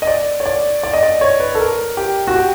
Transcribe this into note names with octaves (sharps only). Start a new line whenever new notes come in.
D#5
D5
C#5
D5
D5
D#5
D5
C#5
B4
A4
A#4
G4
F#4
G4